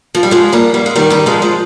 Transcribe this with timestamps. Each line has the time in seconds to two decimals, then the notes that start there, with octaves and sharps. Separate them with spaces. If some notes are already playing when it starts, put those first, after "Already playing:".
0.15 F3
0.23 G3
0.31 F3 G#3
0.53 G3 A#3
0.74 G3 A#3
0.86 G#3
0.96 D#3 G3
1.10 D#3 G3
1.26 F3 G#3
1.42 F3 G#3